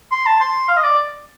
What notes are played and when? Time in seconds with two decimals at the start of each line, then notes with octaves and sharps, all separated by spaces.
0.11 C6
0.26 A5
0.40 C6
0.68 F5
0.77 D#5
0.84 D5